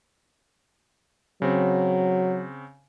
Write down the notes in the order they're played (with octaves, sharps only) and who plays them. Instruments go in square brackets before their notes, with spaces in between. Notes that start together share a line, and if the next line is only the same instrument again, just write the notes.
[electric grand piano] C#3 C4 [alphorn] F#3